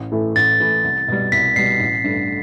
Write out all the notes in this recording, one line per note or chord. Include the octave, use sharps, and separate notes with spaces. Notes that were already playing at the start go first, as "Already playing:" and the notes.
Already playing: A1
A2 E3 A3 E4
A1 A6
A2 E3 A3 E4
C2
B2 G3
C2 B6
B2 G3 C7
A1
G2 D3 A3